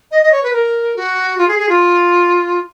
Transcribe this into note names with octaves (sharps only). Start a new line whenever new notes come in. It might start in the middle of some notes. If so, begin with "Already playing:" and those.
D#5
D#5
C#5
B4
A#4
F#4
F4
G#4
G#4
F4